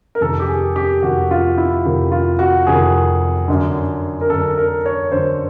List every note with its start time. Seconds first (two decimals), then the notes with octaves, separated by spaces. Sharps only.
0.15 A#4
0.21 F2 C3 D#3 A4
0.40 G4
0.48 G#4
0.76 G4
1.02 F2 C3 D#3 F#4
1.31 F4
1.58 E4
1.85 F2 C3 D#3
2.12 F4
2.39 F#4
2.67 F2 C3 D#3 G#4
3.48 F#2 D3
4.21 A#4
4.30 F#2 D3 A4
4.57 A#4
4.86 C#5
5.12 F#2 D3 C5